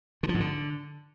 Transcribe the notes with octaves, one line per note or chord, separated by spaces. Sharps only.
D3
F3
G#2
D3